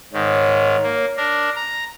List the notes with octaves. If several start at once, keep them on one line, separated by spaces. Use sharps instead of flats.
G#2 D#3 C#5
A#3
D4 A#4
A#5